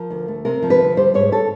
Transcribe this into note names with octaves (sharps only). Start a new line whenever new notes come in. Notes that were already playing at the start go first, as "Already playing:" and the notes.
Already playing: F3 A#4
D2
A3
C3 A#4
F3
B4
D2
G3 C5
G#2 C#5
A4